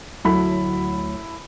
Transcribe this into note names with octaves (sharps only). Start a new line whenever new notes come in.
D2 F#3 E4 A4 B5